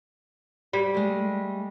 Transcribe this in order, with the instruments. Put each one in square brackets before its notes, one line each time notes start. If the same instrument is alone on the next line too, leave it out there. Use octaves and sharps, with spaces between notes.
[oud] G3
[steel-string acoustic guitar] G#3 A3